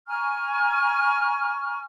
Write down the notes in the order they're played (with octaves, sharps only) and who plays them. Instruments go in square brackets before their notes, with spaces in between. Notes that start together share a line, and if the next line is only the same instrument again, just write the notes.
[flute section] G#5 A#5 C#6 F6